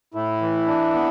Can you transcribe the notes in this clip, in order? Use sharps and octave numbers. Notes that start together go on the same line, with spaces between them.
A2 E4
E3
D4
B3